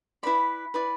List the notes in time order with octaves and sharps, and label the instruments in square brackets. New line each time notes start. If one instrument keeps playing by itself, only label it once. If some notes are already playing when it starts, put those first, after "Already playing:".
[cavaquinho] E4 B4 D5 B5
E4 B4 D5